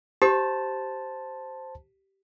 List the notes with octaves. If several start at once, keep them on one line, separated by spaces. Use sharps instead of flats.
G4 C5 A5